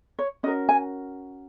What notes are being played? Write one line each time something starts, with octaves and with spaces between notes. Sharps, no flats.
C#5
C#4 F#4 A#4 D#5
G#5